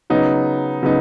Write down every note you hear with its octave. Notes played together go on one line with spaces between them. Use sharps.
C#3 F#3 B3 D#4
C#3 F#3 B3 D#4